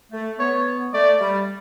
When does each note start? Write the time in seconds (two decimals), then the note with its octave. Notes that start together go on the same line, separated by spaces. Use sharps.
0.12 A3
0.39 B3 C#5
0.94 A3 D5
1.21 G3